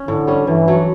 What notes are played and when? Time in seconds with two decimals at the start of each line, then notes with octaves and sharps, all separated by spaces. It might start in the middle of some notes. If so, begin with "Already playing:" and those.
Already playing: C#4
0.08 A2 D3
0.27 G3 C#4
0.47 G2 E3
0.68 F#3 A3